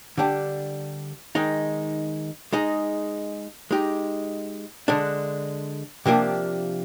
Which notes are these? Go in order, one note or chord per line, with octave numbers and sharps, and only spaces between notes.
D3 G3 D4 G4
D#3 G#3 D#4
G#3 D#4 G#4
G#3 D#4 G4
D3 G#3 D4
C3 F3 A#3 D4 G4